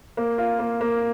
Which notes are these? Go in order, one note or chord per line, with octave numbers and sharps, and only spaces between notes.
A#3
F4
A#3
A#3